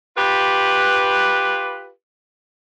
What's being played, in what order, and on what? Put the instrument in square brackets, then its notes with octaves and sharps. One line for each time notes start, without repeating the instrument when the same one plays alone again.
[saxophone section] F4 G4 B4